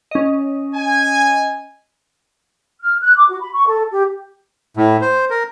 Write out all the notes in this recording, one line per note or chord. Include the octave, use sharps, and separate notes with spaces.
C#4 D#5
G#5
F6
F#6
D6
F#4
B5
C#6
A4
G4
A2
C5
A#4